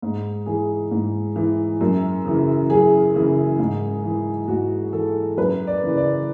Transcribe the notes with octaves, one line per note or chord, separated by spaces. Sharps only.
G#2
E3 G#4
G#2
E3
F#2
C#3 E3
F#2 G#4
C#3 E3
G#2
E3
G#2 F#4
E3 A4
F#2 B4
D5
C#3 E3
D5